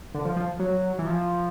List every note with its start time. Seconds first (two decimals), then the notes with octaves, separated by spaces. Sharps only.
0.14 D3
0.25 F3
0.36 F3
0.59 F#3
0.99 E3
1.06 F3